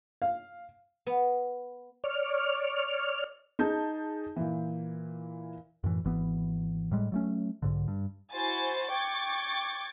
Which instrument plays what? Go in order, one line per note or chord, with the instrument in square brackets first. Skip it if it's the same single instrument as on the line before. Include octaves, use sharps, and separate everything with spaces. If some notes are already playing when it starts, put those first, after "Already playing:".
[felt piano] F5
[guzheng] B3
[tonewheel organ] C#5 D5 F6
[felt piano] D#4 G#4 A5 G6
A#2 E3
[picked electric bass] F#2 A2 E3
G#1 E3 B3
A2 G3 G#3
F#3 A3 C#4
B1 G#2 D3
G2
[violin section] E4 F#4 C5 G#5 A6
G5 C#6 D6 G#6 A6